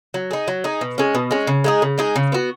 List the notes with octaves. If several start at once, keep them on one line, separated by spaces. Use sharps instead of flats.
F#3
D#4 G#4
F#3
D#4 G#4
B2
G#3 C#4
B2
G#3 C#4
C#3
G#3 D#4 G#4
C#3
G#3 D#4 G#4
C#3
B3 F#4